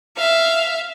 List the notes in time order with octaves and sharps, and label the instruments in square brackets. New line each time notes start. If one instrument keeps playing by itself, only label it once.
[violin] E5 F5